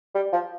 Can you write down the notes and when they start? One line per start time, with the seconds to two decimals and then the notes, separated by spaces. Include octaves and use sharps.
0.15 G3
0.33 F3